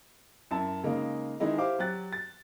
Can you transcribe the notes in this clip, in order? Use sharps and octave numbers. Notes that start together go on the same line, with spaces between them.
F#2 E4 A5
C#3 G#3 A#3 D#4
D#3 E3 G#3 D#4 E4
E4 G4 C5 F5 D6
F#3 G4 F#6 A6
A6